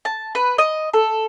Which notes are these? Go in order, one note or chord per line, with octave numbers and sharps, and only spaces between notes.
A5
B4
D#5
A4